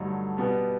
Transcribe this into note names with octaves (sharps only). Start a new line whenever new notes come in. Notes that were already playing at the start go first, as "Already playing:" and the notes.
Already playing: G2 D3 F#3 A3 D#4
B2 G3 B3